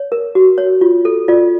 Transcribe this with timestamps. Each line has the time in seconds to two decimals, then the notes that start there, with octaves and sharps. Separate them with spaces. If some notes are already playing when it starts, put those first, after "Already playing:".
Already playing: C#5
0.12 A#4
0.35 F#4
0.58 C#5
0.81 F4
1.05 A4
1.28 F4 D5